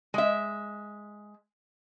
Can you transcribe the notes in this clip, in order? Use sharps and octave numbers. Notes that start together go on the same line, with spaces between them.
G#3 E5